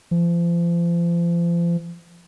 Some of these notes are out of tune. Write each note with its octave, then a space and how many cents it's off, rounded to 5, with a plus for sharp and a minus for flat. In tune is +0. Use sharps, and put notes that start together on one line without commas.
F3 -35